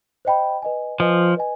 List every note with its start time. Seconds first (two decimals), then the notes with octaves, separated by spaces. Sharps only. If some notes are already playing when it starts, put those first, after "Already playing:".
0.25 C5 D#5 G5 B5
0.62 B4 D#5 G#5
0.99 F3 B4 D#5 G#5
1.37 B4 D#5 G#5